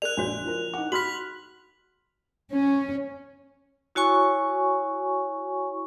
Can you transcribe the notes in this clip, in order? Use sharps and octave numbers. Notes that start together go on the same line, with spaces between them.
A#4 D5 F#6 F7
A#1 D4 F#4 C#5
F3 A#4
D#4 F#5 D6
F#4 B5 C6 F6 B6 F#7
C#4
E4 F#4 C#5 G#5 C#6